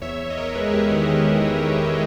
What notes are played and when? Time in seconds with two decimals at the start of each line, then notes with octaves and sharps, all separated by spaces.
0.02 E2 C#5 E5
0.19 E2
0.30 D#5
0.37 E2 A#4 C#5
0.55 G#3 G#4 B4
0.73 E2 G4 A#4
0.91 D#3 E4 G#4
1.02 B4